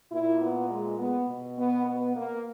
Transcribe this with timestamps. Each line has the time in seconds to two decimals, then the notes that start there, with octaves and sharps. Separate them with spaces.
0.12 A#2 E4
0.41 B3
0.70 G#3
0.99 B3
1.28 B2
1.57 B3
1.87 B3
2.16 A#3